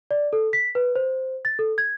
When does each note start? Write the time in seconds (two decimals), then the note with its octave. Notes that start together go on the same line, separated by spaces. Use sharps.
0.11 D5
0.33 A4
0.53 B6
0.75 B4
0.96 C5
1.45 A6
1.59 A4
1.78 G#6